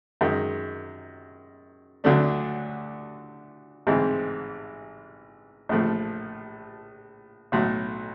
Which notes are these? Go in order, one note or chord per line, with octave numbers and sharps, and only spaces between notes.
F#2 D#3 G#3
D2 D3 F#3 A3 D4
A1 G#2 E3 G#3 C4
A#1 A2 F3 A3
B1 A2 F#3